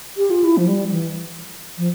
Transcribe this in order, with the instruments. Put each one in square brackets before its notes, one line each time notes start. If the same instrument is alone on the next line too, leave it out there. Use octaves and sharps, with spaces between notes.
[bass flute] G4
F4
E4
F3
G3
E3
F3